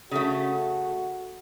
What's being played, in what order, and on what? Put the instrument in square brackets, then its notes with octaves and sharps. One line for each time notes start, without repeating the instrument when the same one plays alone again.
[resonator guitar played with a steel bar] C#3 A3 [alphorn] F#4